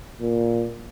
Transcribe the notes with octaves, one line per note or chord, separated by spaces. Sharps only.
A#2